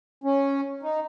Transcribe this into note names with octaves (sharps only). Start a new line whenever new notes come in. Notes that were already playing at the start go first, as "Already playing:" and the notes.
C#4
D#4